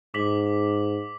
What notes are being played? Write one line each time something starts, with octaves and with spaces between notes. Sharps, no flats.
G#2 D6 B6 F#7